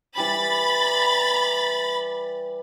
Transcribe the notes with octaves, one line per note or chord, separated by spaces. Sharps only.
E3 G3 B5 A6